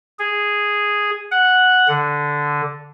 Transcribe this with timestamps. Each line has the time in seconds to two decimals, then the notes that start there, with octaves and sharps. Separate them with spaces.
0.19 G#4
1.31 F#5
1.88 D3